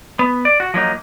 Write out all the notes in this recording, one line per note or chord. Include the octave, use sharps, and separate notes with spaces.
B3
D5
F#4
F3 F#3 A#3 D#4